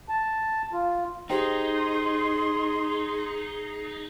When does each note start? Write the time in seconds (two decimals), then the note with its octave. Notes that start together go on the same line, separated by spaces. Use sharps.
0.09 A5
0.73 F4
1.30 D#4 G4 G#4 C5 G5 C6